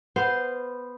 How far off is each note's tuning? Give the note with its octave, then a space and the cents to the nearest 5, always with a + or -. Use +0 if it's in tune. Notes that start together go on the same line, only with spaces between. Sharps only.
B3 +0 C5 -10 F5 +0